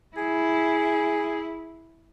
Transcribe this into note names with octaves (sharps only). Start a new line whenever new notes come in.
E4 G#4